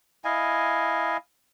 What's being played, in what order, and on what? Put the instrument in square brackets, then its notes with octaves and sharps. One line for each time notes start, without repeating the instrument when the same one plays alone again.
[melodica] E4 D#5 F5 G#5